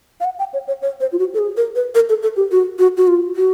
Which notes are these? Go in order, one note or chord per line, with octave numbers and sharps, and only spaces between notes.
F5
F#5
G5
C#5
C#5
C#5
C5
F4
F#4
A4
G#4
A#4
B4
A#4
A4
A4
G4
F#4
F#4
F#4
F4
F#4